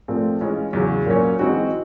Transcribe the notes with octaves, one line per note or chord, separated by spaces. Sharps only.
A#2 F3 A3 C4
E3 G#3 C#4 F4
E2 C#3 F#3
A#2 F#3 A#3 C#4
E3 G#3 C4 D#4 F#4